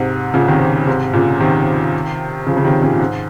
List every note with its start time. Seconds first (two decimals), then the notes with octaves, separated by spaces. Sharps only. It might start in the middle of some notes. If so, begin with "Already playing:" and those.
Already playing: G#2 C3
0.34 A#2 C#3
0.48 C3 D#3
0.87 G#2 C3
1.13 A#2 C#3
1.41 C3 D#3
2.46 C#3 F3
2.57 C#3
2.64 C3 D#3
2.82 A#2 C#3
2.93 A#2
3.00 G#2